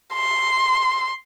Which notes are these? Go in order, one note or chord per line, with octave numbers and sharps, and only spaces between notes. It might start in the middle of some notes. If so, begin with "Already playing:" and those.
C6